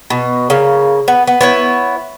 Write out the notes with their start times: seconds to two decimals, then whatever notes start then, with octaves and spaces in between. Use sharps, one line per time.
0.10 B2
0.50 C#3 A#3
1.08 B3
1.27 B3
1.41 B3 E4 C#5